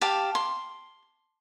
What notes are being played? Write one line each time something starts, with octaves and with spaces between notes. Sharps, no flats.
G4 F5 A5
C6